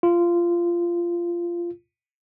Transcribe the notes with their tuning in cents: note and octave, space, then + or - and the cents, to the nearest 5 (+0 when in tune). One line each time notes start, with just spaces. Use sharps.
F4 -15